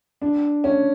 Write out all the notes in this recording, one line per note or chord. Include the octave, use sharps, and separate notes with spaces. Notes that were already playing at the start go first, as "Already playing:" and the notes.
D4
C#4